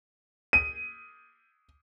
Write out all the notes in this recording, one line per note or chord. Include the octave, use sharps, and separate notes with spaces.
D#7